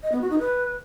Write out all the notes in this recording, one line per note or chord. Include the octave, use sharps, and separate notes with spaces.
D#5
B3
F#4
D#4
B4